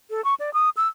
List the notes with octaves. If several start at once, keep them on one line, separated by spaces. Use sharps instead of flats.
A4
C#6
D5
D#6
E6